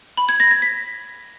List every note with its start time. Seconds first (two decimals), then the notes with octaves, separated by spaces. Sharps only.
0.17 B5
0.29 G#6
0.40 A#6
0.51 G#6
0.62 B6